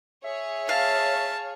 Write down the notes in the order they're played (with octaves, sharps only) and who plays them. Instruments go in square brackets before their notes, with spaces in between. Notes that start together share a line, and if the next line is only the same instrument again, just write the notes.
[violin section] G#4 C#5 [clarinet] E5
[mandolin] F5 [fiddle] A5